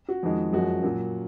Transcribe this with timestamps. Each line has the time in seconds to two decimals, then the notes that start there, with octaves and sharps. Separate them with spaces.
0.08 F#4
0.23 F2 D#3 G#3
0.53 F#2 F3 G#3 F#4
0.83 A#2 F#3